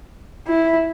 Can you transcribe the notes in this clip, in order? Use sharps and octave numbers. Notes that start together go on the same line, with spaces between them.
E4